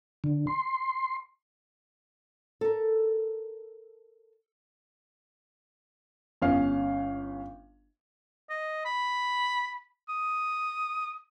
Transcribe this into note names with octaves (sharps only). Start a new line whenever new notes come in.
D3
C6
A4 A#4
G1 C#4 F5
D#5
B5
D#6